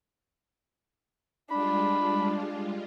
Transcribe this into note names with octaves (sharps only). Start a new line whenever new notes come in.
G3 G#3 D4 F4 B5